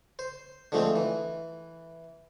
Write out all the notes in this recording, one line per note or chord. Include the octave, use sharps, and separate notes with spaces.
C5
D3 F3 G#3 A3 C4
E3